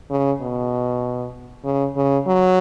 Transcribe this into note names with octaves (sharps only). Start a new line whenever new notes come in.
C#3
B2
C#3
C#3
F#3